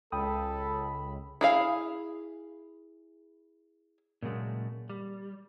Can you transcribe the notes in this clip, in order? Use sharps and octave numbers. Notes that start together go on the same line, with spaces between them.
C#2 A4 G5 B5 D#6
E4 G#4 F5
A#2 C#3 F#3 G#3 A3
G3